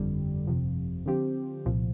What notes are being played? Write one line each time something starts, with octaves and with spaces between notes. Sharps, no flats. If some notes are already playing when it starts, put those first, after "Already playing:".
Already playing: G1 F2 D3 G3
G1 F2 C3 F3
D3 F3 C4 G4
C2 A#2 F3